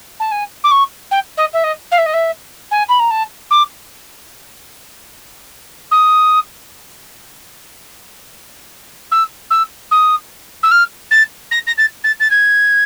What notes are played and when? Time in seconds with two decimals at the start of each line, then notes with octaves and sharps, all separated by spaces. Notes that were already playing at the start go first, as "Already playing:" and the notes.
0.19 A5
0.31 G#5
0.64 D6
0.71 C#6
1.11 G5
1.37 D#5
1.53 E5
1.63 D#5
1.91 F5
1.98 E5
2.06 D#5
2.13 E5
2.71 G#5
2.88 B5
2.99 A#5
3.10 A5
3.50 D6
5.91 D#6
9.11 E6
9.50 E6
9.91 D#6
10.63 E6
10.71 F6
11.11 A6
11.51 A#6
11.67 A#6
11.77 A6
12.04 A6
12.20 A6
12.30 G#6